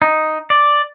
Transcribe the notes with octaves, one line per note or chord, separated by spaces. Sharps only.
D#4
D5